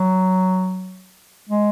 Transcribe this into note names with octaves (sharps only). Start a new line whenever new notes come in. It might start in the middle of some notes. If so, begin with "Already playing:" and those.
Already playing: F#3
G#3